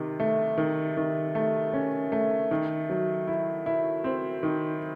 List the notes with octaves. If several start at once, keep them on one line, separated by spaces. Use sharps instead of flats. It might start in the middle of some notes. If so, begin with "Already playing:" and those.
Already playing: C3 D#3
A3
D#3
D#3
A3
C#4
A3
D#3
F#3
E4
E4
C4
D#3